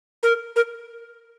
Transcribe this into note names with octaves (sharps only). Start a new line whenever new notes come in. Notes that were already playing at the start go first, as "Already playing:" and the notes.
A#4
A#4